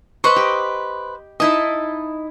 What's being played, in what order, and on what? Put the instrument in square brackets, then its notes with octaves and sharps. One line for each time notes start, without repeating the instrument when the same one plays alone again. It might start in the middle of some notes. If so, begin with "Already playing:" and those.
[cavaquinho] B4 C5 C#6 [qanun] D#5 B5
[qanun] G4
[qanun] D#4 E4 A5 [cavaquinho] D#5